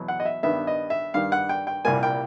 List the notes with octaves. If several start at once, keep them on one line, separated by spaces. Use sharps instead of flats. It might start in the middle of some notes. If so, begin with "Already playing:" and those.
Already playing: E2 B2 F#3
F#5
D#5
E5
G2 D#3 G3 B3 E5
D#5
E5
G2 D#3 G3 F5
F#5
G5
G5
C2 A#2 G3 A#3 G#5
G5